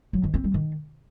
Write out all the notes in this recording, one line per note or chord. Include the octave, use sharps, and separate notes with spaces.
F#3
D#3
C4
G3
D#3